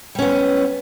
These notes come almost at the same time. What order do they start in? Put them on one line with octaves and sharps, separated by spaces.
G3 C#4 B3